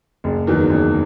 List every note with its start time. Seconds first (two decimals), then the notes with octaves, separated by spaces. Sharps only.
0.24 F#1
0.47 E2 D#3 F#3
0.69 F#1